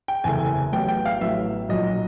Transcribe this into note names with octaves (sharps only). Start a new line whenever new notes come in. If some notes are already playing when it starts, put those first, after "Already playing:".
G5
F#1 E2 C3 E3 A3 G#5
A1 A2 F#3 B3 G5
G5
F5
A1 A2 F#3 B3 E5
B1 A#2 F#3 D#5